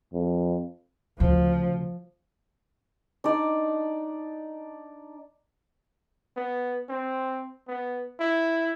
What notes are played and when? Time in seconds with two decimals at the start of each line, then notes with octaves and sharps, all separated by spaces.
0.13 F2
1.20 D2 C#3 F3
3.24 D4 D#4 D5
6.37 B3
6.90 C4
7.68 B3
8.20 E4